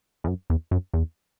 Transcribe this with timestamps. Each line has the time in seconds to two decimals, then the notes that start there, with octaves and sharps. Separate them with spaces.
0.24 E2
0.28 F#2
0.50 E2
0.71 F#2
0.93 E2